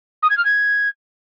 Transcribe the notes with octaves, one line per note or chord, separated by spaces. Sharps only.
D#6
G#6
F6
G#6